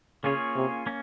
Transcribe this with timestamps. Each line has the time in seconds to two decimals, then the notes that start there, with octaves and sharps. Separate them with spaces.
0.24 C#3 A#3 C#4 F4 G#4 C#5
0.56 C3
0.86 A#3 C#4